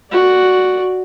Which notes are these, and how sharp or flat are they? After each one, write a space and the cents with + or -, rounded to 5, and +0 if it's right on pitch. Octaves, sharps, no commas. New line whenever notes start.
F#4 +0 D5 +0